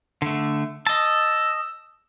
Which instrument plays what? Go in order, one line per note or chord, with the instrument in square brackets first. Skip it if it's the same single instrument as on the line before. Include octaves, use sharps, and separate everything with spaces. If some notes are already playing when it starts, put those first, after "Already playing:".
[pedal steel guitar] D3 A3
[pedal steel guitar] D#5 A5 [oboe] E6